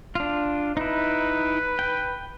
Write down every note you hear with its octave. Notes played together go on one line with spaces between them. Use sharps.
D4 F4
D#4 E4 B4
G5